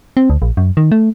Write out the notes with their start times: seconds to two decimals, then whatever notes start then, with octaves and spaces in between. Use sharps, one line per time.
0.17 C4
0.30 D2
0.42 A#1
0.57 F#2
0.77 D#3
0.92 A3